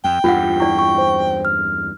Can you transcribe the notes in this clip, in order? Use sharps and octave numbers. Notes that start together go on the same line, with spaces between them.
F2 G5
E2 G2 F4 F#5
E4 D5 C#6
C#6
C5
F6